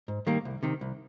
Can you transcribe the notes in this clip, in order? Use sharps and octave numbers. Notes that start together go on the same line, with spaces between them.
G#2
D#3 G3 A#3
C2
C3 D#3
C2